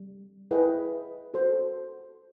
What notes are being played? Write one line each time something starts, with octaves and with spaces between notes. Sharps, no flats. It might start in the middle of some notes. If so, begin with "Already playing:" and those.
Already playing: G3
E4 G#4 B4 D#5 G5
F#4 A4 C5